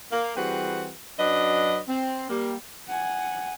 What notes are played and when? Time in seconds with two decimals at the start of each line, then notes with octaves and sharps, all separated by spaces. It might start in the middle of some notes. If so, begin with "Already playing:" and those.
0.11 A#3
0.36 E3 G3 C4 F#4 G#4 B4
1.18 F#2 F#3 D4 B4 D#5
1.88 C4
2.29 G3 A#3
2.88 F#5 G#5